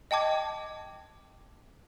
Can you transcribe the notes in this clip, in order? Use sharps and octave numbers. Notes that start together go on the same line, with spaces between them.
D#5 G5 A5 D6 G#6